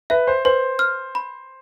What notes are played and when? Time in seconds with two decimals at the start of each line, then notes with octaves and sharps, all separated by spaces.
0.10 B4 E5
0.27 C5
0.45 B4 C5
0.79 F6
1.15 B5